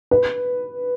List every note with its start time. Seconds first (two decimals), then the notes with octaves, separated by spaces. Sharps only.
0.11 B4